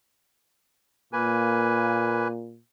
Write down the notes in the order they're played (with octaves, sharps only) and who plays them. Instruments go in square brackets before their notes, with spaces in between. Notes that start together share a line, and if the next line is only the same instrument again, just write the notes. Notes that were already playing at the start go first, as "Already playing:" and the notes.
[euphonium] A#2 [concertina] A#3 B4 G#5